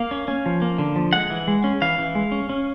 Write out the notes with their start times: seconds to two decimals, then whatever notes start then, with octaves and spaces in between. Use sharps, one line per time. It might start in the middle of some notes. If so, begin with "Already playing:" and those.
Already playing: A#3 F5
0.11 C#4
0.28 C#4
0.46 F3
0.62 A#3
0.78 D3
0.96 F3
1.13 G#3 F#5
1.31 E3
1.48 G#3
1.64 C#4
1.82 E3 F5
1.98 E3
2.15 G#3
2.32 C#4
2.49 C#4